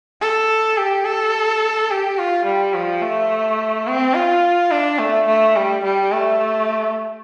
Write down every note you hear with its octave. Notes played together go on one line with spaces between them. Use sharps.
A4
G4
A4
G4
F4
G3
F3
A3
C4
F4
D4
A3
A3
G3
G3
A3